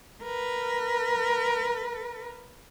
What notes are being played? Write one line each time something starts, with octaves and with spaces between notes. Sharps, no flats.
A#4 B4